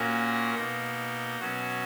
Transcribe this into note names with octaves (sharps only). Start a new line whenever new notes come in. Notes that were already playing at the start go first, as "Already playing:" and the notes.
Already playing: A#2 A#3 C#4 F#4 A#4
B2 A#3 D#4
B2 F#3 C#4 F#4